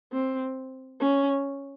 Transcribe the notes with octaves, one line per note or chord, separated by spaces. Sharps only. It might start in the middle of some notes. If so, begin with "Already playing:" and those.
C4
C#4